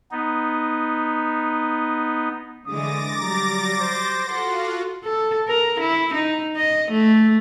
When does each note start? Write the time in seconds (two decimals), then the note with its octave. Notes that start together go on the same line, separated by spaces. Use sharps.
0.11 B3 D#4
2.67 D3 E3 G#3 D6 D#6 A6 A#6
3.20 F#3 G3 A#5
3.81 C5
4.29 F4 F#4 A4 F#5 C6
5.04 A4
5.48 A#4
5.80 E4
6.14 D#4
6.56 D#5
6.91 A3